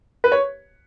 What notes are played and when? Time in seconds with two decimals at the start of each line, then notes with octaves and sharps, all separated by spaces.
0.24 B4
0.32 C#5